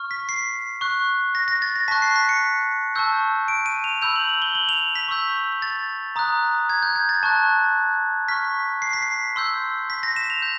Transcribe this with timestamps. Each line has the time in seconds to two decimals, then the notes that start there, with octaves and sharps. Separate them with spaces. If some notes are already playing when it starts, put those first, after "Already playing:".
Already playing: C#6 F6
0.11 B6
0.29 C7
0.81 C#6 F#6
1.35 A#6
1.48 A#6
1.62 A6
1.76 A#6
1.88 A5 C#6 F#6 B6
2.02 C7
2.16 B6
2.29 C#7
2.96 A5 C#6 E6 G6
3.48 D7
3.66 D#7
3.84 F7
4.02 B5 E6 G6 F7
4.16 F#7
4.29 F#7
4.42 G7
4.55 F#7
4.69 F7
4.95 B6
5.08 C#6 E6 G6
5.62 A6
6.16 A#5 D#6 F#6
6.70 G#6
6.83 G6
6.96 G#6
7.09 A6
7.23 A5 C#6 F#6
8.28 C#6 F6 B6
8.82 C7
8.93 B6
9.02 C7
9.36 C6 E6 G6
9.90 B6
10.03 A#6
10.16 E7
10.30 F7
10.42 G6